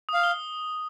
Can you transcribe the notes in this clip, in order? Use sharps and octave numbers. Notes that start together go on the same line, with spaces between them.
F5 D#6
G7